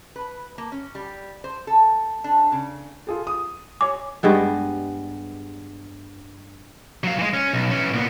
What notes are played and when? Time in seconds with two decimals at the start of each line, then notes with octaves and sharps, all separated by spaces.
0.16 B4
0.58 A#3
0.72 C#4
0.95 G3
1.44 C5
1.67 A4
2.24 D4
2.52 C#3
3.07 F4 G#4 A4
3.27 D#6
3.81 C#5 G#5 D6
4.23 G2 G3 G#3 B3
7.04 F#3 F5
7.19 E3 G#3
7.34 C#4
7.53 B1
7.71 E3 C#4
7.94 A#2 B3